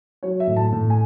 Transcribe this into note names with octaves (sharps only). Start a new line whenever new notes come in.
F#3 C#5
E5
A2
A5
A2
G#5